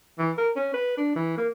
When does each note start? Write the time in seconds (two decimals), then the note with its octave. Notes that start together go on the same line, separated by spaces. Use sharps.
0.18 E3
0.38 A#4
0.56 C#4
0.74 B4
0.97 D4
1.15 E3
1.37 A#3